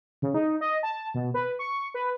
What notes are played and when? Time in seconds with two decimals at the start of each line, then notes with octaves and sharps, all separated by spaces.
0.22 C#3
0.34 D#4
0.61 D#5
0.83 A5
1.14 B2
1.34 B4
1.59 C#6
1.94 B4